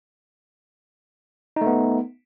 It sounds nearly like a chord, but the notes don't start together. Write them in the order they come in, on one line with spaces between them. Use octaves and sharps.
D#4 A3 B3